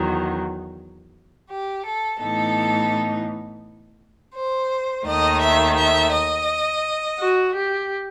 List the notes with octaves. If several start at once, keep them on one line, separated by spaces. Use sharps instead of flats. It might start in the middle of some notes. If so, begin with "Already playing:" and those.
Already playing: E2 D#3 F#3
G4
A4
A2 E3 B3 D#4 A4
C5
D#2 D#3 A3 D#5
E5
E5
D#5
F#4
G4